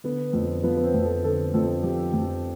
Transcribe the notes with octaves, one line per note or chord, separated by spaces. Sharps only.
D3 B3
F2
F3 B3
B3
C4
F2
A4
D3 A4
F2 A4
F3 G4
F2